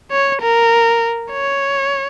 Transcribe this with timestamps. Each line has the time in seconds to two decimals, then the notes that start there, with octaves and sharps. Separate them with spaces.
0.12 C#5
0.42 A#4
1.31 C#5